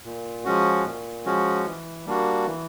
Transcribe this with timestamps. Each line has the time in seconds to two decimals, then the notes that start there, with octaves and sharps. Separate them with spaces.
0.05 A#2
0.45 F3 G#3 C#4 F#4
0.85 A#2
1.26 F3 G#3 C#4 F#4
1.65 E3
2.05 G3 A#3 D4 F#4
2.46 E3